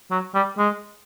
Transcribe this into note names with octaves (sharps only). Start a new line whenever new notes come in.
F#3
G3
G#3